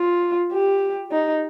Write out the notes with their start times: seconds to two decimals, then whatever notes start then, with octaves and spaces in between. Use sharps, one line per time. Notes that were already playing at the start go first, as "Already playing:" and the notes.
Already playing: F4
0.52 G4
1.11 D#4